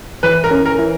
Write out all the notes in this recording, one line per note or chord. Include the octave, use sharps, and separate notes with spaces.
E3 B4
A#4
C#4
A#4
E3